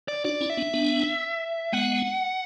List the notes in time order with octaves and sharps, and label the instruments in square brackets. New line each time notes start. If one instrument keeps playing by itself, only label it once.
[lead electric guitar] D5
[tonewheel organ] D4 F#4 [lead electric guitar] D5
[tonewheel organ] C#4 E4
[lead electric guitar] E5
[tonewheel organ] B3 D4
B3 D4
[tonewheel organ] G#3 B3 [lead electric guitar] F#5